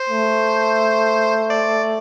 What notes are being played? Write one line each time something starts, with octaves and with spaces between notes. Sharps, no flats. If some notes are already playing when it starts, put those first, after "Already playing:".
Already playing: C5
A3
D5